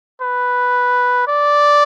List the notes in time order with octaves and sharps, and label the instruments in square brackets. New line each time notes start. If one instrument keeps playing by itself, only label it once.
[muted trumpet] B4
D5